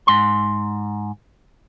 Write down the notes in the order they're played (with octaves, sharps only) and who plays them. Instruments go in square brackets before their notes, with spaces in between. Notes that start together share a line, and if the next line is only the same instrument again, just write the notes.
[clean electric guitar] G#2 C6